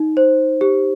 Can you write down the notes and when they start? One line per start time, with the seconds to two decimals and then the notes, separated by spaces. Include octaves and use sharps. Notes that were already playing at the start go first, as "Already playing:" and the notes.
Already playing: D#4
0.17 C5
0.61 G4